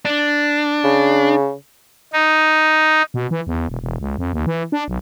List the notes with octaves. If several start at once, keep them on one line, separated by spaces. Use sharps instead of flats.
D4
C#3
D#4
B2
E3
E2
E1
E1
C#2
F2
D#2
E3
D4
B1